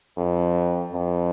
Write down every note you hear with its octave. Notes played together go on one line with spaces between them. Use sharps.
F2
F2